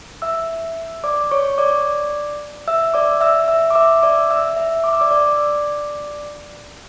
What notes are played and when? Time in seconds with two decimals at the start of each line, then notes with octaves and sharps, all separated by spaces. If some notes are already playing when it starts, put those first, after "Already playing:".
0.22 E5 E6
1.04 D5 D6
1.31 C#5 C#6
1.58 D5 D6
2.68 E5 E6
2.94 D5 D6
3.21 E5 E6
3.48 E5 E6
3.71 D6
3.75 E5 E6
4.03 D5 D6
4.30 E5 E6
4.57 E5 E6
4.84 D6
4.93 E6
5.00 D5 D6
5.11 D5 D6